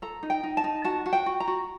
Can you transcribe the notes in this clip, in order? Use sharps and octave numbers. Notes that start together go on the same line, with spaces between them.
A4 A#5
D#4
G5
D#4
A5
D#4
F#4 A5
F#4
G5
F#4
A#5
F#4